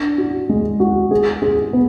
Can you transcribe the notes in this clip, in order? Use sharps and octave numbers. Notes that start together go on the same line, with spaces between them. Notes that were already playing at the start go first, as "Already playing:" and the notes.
Already playing: D4
F#4
G#3
F#4
G#4
G#4
B3